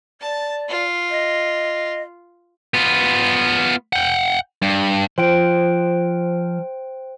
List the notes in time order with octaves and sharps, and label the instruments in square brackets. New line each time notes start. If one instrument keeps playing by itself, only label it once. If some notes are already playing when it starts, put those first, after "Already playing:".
[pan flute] D5 [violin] A5
[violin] F4
[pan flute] D#5
[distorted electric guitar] B3 F4
F#5 G5
G2
[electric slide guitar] F3 [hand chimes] C5 G5 D7